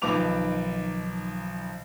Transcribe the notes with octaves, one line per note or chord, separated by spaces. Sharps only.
B1 D#3 F3 B4 D6 F7